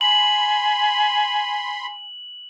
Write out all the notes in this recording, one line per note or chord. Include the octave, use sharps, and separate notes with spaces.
G#5 B5 C6 F#7